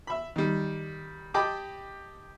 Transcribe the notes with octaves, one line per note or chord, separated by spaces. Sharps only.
E5 B5
D#3 G3
G4 D#5 G5 A5 B5 D6